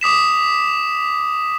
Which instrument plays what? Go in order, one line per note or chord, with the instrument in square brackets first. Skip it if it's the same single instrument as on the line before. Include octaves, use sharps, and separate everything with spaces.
[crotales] D6 D#6 B6 E7